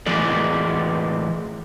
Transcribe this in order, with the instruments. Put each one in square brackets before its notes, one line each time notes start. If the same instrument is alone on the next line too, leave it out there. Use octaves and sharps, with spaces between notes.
[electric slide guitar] A2 E3 G#3 G#4 D5